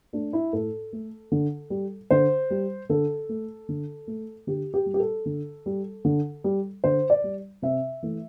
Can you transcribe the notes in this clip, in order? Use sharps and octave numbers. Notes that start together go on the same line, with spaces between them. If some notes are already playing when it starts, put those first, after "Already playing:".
A3 D4
E4
A2 A4
A3
D3
G3
D3 C5
G3
D3 A4
A3
D3
A3
D3 G4
G4
G3
G4
A4
D3
G3
D3
G3
D3 C5
D5
G3
C3 E5
E3 A3